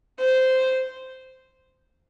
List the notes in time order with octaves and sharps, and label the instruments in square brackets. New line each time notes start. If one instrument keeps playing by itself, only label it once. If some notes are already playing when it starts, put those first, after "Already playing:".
[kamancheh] C5